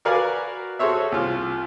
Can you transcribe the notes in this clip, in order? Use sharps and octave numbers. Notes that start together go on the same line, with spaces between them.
F#4 A#4 B4 D5 F5 G#5
F#4 G#4 A4 C5 C#5 E5
C2 F4